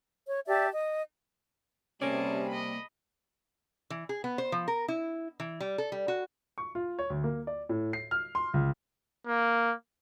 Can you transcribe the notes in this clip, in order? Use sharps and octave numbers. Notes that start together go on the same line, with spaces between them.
C#5
G4 D5 E5 A5
D#5
C3 G3 A#3 C#4 G#4 A#4 D5 A5
D#5 B5
E3
G#4
B3
C5
F3
A#4
E4
E3
G3
A4
G3
F#4
C#6
F4
C#5
D2
A#3
D5
A2
C7
F6
C6
C#2
A#3